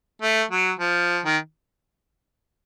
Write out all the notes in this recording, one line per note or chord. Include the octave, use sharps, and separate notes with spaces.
A3
F#3
F3
D#3